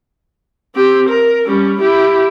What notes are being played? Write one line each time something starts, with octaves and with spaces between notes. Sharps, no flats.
C4 G4
A#4
G3 C#4
E4 G4